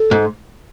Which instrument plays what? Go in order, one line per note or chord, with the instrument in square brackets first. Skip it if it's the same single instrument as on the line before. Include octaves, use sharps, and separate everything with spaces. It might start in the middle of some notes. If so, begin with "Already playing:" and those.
Already playing: [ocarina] A4
[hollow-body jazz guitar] G#2